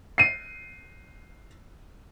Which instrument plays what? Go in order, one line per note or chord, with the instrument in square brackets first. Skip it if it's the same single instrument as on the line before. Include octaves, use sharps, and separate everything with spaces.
[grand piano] C7 D#7